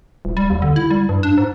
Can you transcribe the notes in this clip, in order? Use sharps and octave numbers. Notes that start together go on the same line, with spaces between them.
D#1
G3
D#2
D3
E4
G3
G2
D4
G#2